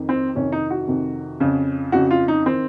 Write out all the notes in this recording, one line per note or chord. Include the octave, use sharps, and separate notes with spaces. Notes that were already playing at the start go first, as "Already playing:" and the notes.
Already playing: F2 D#3
C4
F2 C3 D#3 C#4
D#4
F#4
F2 C3 D#3
F2 C#3
F2 C#3 F#4
F4
D#4
D#3 C4